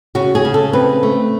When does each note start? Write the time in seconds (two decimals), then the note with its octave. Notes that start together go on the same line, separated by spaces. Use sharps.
0.15 C#3 F#4
0.35 G#4
0.45 C#3
0.54 A4
0.73 C4 B4
1.03 A3